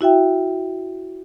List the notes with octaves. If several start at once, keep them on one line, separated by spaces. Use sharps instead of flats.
E4 F#4 E5 G5